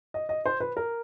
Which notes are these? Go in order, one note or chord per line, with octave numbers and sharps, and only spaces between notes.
D#5
D#5
C5
B4
A#4